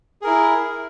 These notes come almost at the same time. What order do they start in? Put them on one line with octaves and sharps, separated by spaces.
G#4 A#4 E4